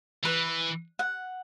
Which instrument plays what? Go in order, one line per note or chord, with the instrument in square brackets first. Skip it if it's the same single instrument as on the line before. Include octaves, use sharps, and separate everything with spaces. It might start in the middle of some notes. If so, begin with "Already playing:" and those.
[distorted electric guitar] E3 [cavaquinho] B4
[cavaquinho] F#5